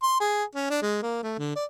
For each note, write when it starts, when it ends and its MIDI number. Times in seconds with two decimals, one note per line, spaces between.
0.02 0.17 84
0.20 0.44 68
0.55 0.66 61
0.70 0.79 62
0.82 0.98 56
1.02 1.22 58
1.23 1.34 57
1.38 1.54 50
1.56 1.65 74